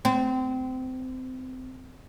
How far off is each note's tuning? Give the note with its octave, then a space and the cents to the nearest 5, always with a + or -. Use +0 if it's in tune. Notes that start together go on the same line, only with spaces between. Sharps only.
C4 -25